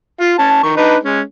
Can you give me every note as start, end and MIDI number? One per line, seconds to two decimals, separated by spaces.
0.21 0.38 65
0.39 0.60 61
0.39 0.60 81
0.63 0.73 51
0.63 0.73 85
0.77 0.97 62
0.77 0.97 63
0.77 0.97 71
1.04 1.21 56
1.04 1.21 61